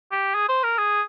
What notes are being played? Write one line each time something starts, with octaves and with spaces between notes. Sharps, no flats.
G4
G#4
C5
A#4
G#4